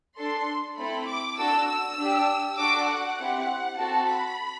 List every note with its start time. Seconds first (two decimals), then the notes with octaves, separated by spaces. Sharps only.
0.18 D4 A4 C6
0.78 A3 C4 E4 A4 B5
1.08 D6
1.38 D4 F#4 A4 E6
1.68 E6
1.98 D4 G4
2.58 D4 F#4 A4 D6
2.88 F#5
3.19 C4 E4 G4
3.78 C4 F#4 A4 A5
4.08 B5